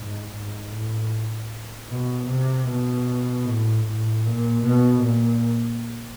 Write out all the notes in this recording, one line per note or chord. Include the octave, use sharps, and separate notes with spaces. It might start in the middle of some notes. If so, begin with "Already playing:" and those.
Already playing: G#2
G#2
A2
B2
C3
B2
A2
A2
A#2
B2
A#2